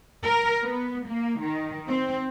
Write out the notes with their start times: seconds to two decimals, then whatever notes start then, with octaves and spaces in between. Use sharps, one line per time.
0.23 A#4
0.62 B3
1.07 A#3
1.40 D#3
1.88 C4